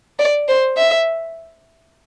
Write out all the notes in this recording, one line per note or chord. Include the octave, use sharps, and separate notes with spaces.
D5
C5
E5